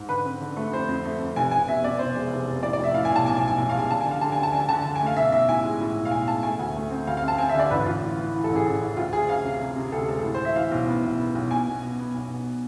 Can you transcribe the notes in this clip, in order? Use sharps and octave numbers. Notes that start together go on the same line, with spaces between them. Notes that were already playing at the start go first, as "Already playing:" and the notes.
Already playing: G#2
D3 B4
C4
D3
A3
F2 C5
F2
A3
F2
F1 G#5
F1 G#5
B2 E5
B2 D5
F1 C5
G#3
F1
F1
A2 D5
D5
A2 E5
A2 F5
G#5
B1 A5
B1 G#5
G#5
B1
G#5
B1 G#5
F5
G#3 G#5
D3 A5
G#5
D3 F5
D3 A5
G#5
D2
A5
D3 G#5
D3 A5
D3
G#5
A3
F5
B1 E5
B1 E5
A2 G#5
G#3
A2
B1
F5
B1 G#5
G#3 A5
A3 G#5
D2
A3
C4
D2 F5
F5
C4
A5
C4 G#5
E5
D3 D5
A1 B4
A1 F4
A2
A2
E3
A4
A1
G#4
A1
A1
D2 F4
D2 G#4
D2 F5
C3
C3
C3
D2 A4
G#3 A4
A2
C5
E3 E5
E3 F5
B1
B3
B1
B3
B1
B2 G#5
B2
B2
B3
B1
B2